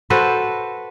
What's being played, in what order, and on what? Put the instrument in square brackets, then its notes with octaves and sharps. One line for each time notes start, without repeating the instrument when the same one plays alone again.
[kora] F#4 A4 B4 C5